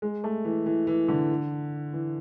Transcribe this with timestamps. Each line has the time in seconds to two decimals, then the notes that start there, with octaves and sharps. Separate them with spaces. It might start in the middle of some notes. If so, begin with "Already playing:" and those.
0.02 G#3
0.24 A3
0.45 E3
0.66 E3
0.87 E3
1.08 D3
1.93 E3